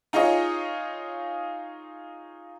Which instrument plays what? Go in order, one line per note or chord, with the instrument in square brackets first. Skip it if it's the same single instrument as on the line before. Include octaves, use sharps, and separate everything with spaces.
[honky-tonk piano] D#4 F4 G#4 C#5 D#5